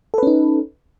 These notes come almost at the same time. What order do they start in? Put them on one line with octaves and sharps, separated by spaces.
A4 B4 C#4 D#4